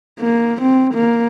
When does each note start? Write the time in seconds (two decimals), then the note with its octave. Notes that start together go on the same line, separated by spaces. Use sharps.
0.20 A#3
0.62 C4
0.95 A#3